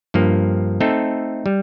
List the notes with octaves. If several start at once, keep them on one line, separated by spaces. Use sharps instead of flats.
G2 F3 A#3
A3 C4 D#4 A4
G3